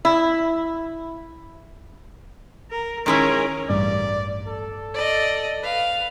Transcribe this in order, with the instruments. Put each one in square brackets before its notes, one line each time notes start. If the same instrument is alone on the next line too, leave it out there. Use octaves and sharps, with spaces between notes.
[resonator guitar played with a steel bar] E4
[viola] A#4
[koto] D#3 G#3 E4 [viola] C#4 A#4
[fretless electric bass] A1 G2 [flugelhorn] D5
[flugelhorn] A4
[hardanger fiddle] D5 D#5
B4 F5